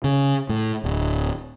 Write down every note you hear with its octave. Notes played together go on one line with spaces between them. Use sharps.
C#3
A2
D1